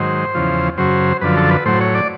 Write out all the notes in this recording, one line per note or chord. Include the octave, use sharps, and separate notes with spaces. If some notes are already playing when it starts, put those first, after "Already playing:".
Already playing: G#2 D#3 F#3 C5
E2 C#3 F3
F#2 C#3 F#3 C5
F#2 D3 F3 B4
A4
B4
A2 F#3 C5
C#5
D5